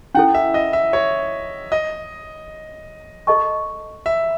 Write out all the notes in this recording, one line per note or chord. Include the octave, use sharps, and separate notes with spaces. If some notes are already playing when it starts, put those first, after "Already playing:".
C#4 E4 A4 F#5
E5
D#5
E5
C#5
D#5
A4 D#5 A5 C#6
E5